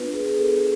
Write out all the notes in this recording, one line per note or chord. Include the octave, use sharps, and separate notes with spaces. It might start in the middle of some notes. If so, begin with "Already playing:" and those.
Already playing: B3 D4 F4 B4
G#4
A4